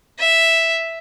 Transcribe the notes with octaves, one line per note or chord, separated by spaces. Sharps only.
E5